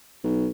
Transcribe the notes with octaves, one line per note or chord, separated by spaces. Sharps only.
B1